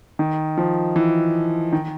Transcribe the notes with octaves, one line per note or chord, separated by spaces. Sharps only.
D#3
F3
E3
D#3